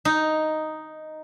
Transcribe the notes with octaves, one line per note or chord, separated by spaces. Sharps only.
D#4